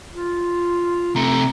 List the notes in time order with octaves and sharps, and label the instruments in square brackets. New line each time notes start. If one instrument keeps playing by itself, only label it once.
[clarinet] F4
[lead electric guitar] C3 A3 [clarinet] A#5